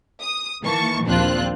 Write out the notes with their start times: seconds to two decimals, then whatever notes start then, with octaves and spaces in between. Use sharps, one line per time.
0.21 D#6
0.63 D#3 E3 A#3 A5 C#6
1.05 A#1 D#2 C4 D4 F4 F#6